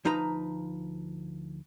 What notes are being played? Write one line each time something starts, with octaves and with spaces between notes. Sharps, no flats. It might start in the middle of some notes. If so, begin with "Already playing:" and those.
D2 F3 D#4 B4 A#5